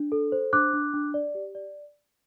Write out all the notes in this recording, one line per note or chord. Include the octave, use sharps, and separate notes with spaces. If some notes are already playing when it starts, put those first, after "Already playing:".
Already playing: D4
A4
C5
D4 D6 F#6
D4
D4
D5
G4
D5